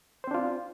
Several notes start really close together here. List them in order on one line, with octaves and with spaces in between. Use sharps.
C5 C4 D4 F4